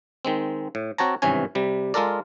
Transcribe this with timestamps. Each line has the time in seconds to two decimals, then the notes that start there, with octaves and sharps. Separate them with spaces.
0.25 D#3 G#3 C4
0.75 A2
0.98 C4 F#4 C#5 A5 A#5
1.22 G#1 G2 C3 E3 C#4 G#5
1.55 C3 G3
1.94 G#3 F4 A4 A#4 D5